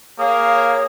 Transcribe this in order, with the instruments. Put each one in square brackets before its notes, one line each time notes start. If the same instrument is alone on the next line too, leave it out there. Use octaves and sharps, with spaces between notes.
[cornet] A#3 [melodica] G#4 [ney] C#5 [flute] F5